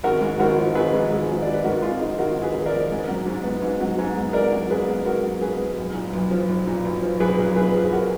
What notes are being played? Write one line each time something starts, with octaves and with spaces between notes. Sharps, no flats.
G#1 F#4 A#4
G#2
G#1 F#4 A#4
F3
G#1 G#4 B4
G#2
G#1
F3
G#1 D5
B4
G#2 F#4 A#4
G#1 F4 G#4
F3 D#4
G#1 F#4 A#4
G#2
G#4 B4
G#1
A#4 D5
F3
G#2
F#3
G#2
B3
G#2
F#3
G#2
B3
G#2 A#4 D5
F#3
G#2 G#4 B4
B3
G#2 F#4 A#4
F#3
G#2 G#4 B4
B3
B1
A#2
B1
F3
B1
A#2
B1
F3
B1 G#4 B4
A#2
B1 G#4 B4
F3
G#4
F#4 A#4